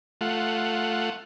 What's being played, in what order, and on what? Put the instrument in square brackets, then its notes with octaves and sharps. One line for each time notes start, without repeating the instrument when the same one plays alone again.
[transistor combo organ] A3 F4 F#5